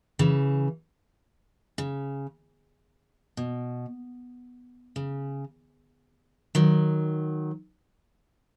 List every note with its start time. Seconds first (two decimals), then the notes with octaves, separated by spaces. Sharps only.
0.19 C#3 E3
1.78 C#3
3.37 B2
4.96 C#3
6.55 D#3 F#3